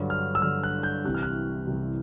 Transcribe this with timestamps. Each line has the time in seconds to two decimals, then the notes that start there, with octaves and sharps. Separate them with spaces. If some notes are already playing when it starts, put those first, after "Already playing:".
Already playing: G2 D3 F#3
0.10 F6
0.35 E6
0.42 G2 D3 F#3 F6
0.63 F#6
0.83 G6
1.04 C2 C3 E3 G3 F#6
1.14 F6
1.23 F#6
1.67 C2 C3 E3 G3